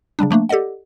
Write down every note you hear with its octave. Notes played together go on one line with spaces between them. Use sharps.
C#3 F#3 G3 D4
F3 A3 A#3 D4
G4 A4 D5 D#5 F#5